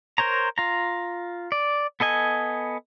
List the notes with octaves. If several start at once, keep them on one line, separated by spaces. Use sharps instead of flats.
A#4 C5 C#5 A#5
F4 A#5
D5
B3 A4 D#5 G#5